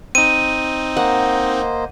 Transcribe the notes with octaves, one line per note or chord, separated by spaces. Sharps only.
C4 D#4 D#7
A#3 C5 D#5 F#5